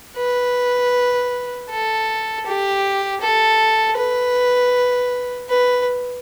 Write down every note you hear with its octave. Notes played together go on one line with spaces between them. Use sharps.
B4
A4
G4
A4
B4
B4